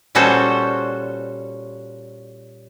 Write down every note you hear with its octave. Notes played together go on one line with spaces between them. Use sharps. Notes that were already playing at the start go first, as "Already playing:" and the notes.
A#2 G3 C#4 F#4 A4 C5